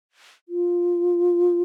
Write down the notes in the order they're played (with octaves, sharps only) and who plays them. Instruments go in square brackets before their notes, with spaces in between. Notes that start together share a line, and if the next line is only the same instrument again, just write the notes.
[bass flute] F4